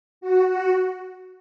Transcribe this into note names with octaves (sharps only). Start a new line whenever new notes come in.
F#4
F#4